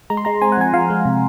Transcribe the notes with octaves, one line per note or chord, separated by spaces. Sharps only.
G#3 A#5
C6
G#3 A#5
C4 G#5
F#5
F3 G#5
F3 F5
G#3
C3